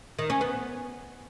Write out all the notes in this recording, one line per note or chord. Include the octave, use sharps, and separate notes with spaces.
D#3
C#4
B3